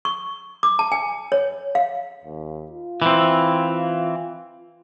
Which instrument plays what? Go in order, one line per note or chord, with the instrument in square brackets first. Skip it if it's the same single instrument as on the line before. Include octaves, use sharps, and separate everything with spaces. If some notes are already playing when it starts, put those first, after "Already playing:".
[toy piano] C#6
D6
A5
G#5
C#5
F5
[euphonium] D#2
F4
[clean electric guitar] E3 C4